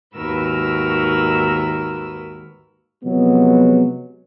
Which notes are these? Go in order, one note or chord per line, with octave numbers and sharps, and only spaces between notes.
D#2 G#2 F#4 A#4 B4 E6
C3 F3 F#3 G#3 B3